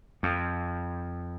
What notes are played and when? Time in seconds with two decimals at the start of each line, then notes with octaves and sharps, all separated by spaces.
0.23 F2